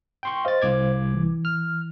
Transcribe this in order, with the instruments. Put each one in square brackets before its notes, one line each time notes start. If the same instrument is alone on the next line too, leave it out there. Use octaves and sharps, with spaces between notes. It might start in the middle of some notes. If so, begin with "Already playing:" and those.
[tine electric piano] G5 C6 C#6
[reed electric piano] C5 F5 [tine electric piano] D#5 A6
[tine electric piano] C2 D6 G#6
[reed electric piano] E3
[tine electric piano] F6